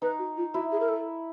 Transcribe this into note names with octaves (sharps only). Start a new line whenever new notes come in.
D#4 B4
F#4
F4
E4 F#4
G#4
A#4
A4